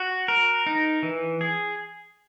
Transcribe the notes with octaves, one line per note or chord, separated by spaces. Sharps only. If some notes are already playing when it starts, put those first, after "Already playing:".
Already playing: F#4
A#4
D#4
E3
G#4